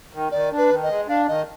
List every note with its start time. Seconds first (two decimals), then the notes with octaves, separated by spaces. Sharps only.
0.13 D#3
0.32 D#3 D5
0.52 D4
0.58 B4
0.70 D#3
0.83 D#5
0.89 G#3
1.08 D4 F5
1.28 D#3 D#5